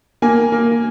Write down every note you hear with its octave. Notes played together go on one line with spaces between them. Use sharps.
A#3 G#5
A#3